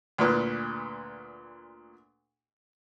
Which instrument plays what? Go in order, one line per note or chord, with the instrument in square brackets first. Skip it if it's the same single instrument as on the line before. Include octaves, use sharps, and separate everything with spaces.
[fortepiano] D2 A#2 B4